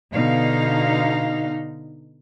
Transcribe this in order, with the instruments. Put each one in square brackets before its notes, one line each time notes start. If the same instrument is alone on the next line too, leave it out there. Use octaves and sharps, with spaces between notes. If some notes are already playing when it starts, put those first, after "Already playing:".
[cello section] B2 D3 D#4 F5